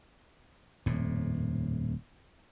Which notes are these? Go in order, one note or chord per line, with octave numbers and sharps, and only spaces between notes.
D#1 F2 A2